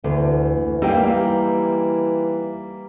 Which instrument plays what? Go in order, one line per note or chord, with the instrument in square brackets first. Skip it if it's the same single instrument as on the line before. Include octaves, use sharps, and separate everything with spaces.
[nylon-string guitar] D2 [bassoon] E3
[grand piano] G3 A#3 [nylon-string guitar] D#4 [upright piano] F5 G5 E6